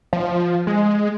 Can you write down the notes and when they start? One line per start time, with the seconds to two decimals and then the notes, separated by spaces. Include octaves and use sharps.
0.13 F3
0.67 G#3